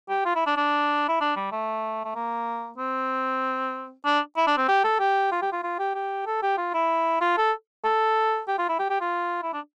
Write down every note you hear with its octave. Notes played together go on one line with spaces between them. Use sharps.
G4
F4
E4
D4
D4
E4
D4
G3
A3
A3
A#3
C4
D4
E4
D4
C4
G4
A4
G4
F4
G4
F4
F4
G4
G4
A4
G4
F4
E4
F4
A4
A4
G4
F4
E4
G4
G4
F4
E4
D4